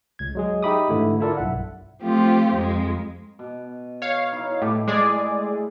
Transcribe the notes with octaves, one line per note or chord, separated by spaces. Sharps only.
C#2 G#6
F#3 G#3 G#4
D#4 G4 E5 B5 D6 D#6
G#2 D3 E3 A3 E4
E4 F4 A4 A#4 D5
B1 G2 E5 F#5
F3 A3 C4 F4 G4
F2 G#3
B2
C#5 F5
D#4 E4
A2 G4
A2 G#3 G#4 D5 C6 D6